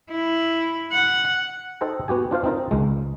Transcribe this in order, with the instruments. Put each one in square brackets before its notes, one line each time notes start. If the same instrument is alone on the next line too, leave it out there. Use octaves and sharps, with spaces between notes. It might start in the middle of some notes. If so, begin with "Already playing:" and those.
[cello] E4
F#5
[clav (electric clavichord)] D#4 A4 C5 G5 A#5
B3 F#4 G4 G#5
D4 F4 C5 F5
C4 D#4 F4 A#4
C#2 G#3